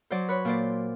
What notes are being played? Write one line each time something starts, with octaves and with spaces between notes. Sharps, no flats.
F#3 C5 D5
B4 C#5
A#2 C5 D5